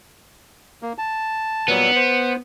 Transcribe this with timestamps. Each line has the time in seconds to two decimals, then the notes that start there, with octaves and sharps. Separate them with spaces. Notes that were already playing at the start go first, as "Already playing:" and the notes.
0.82 A#3
0.98 A5
1.68 A#2 F#3 G3 B3
1.96 C5